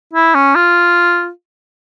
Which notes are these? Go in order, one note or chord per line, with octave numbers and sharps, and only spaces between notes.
E4
C#4
F4